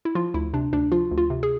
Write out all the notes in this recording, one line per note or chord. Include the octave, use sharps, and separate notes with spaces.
E4
F3 F4
D2 E4
C3 D4
D2 D4
F3 F4
D2
F4
C3
G#4